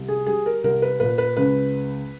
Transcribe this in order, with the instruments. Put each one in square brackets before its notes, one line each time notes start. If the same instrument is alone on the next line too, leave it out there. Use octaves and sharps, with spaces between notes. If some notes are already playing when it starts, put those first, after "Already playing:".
Already playing: [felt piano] C2
G#4
G3 G#4
A#4
C2 A#4
B4
A#2 B4
B4
C#2 B4